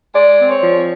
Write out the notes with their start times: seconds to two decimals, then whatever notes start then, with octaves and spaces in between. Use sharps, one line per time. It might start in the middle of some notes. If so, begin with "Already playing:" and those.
0.15 G#3 D5
0.39 C4
0.51 C#5
0.63 F3